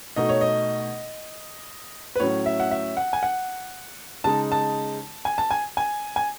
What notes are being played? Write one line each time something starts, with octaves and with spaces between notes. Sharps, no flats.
B2 A3 D#4 D#5
C#5
D#5
B4
A2 F#3 C#4 C#5
E5
F#5
E5
F#5
G#5
F#5
C#3 G#3 D#4 A5
A5
G#5
A5
G#5
G#5
G#5